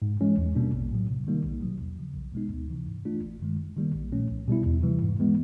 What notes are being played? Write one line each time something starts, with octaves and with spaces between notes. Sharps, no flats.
G#2
E3 G#3 C#4
E2
B2 G3 A#3 D4
A#1
A2 F#3
C3
D#3 G3 A#3 D#4
B1
B2 F#3
E2
C#3 F3
B1
B2 G#3 B3 D#4
D2
C3 E3
G#2
E3 A3 D4 F4
G1
G2 D#3 G#3
F#2
D#3 G3 A#3
A#1
A#2 F3 A3 C#4
C2
B2 G3 B3 E4
E2
C3 E3 G3
G#2
E3 G#3 B3